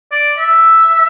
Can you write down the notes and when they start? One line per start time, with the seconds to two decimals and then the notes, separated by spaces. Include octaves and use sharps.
0.12 D5
0.38 E5